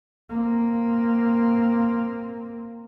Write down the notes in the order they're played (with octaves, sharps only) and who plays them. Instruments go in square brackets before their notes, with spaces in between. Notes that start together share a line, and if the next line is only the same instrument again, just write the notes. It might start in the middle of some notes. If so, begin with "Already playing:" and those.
[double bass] A#3 C4